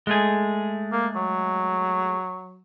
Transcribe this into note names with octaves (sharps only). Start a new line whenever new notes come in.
G#3 A3 G#4
A#3
F#3